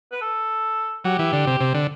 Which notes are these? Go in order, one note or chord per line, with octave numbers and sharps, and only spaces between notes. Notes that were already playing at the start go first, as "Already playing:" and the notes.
B4
A4
F#3 G4
E3
D3
C3
C3
D3